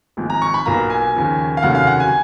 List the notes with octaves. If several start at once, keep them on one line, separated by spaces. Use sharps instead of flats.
G#1 G#2 F3
A#5
C#6
B5
B1 B2 A#3 F4 A#5
G#5
D#2 C#3 F3
F5
F1 D#2 C#3 F#3 F#5
F5
F#5
G#5